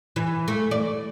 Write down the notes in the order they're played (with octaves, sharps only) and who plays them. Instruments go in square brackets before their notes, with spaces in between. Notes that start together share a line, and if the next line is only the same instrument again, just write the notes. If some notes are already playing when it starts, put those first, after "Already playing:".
[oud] E3
A3
D5